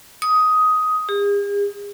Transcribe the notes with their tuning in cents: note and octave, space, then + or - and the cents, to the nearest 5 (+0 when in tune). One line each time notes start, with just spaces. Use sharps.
D#6 +10
G#4 -45